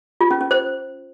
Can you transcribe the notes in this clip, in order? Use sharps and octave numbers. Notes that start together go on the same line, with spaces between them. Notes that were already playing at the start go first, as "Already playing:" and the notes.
F4
C#4
C#4
C5